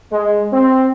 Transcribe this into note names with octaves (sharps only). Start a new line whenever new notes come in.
G#3
C4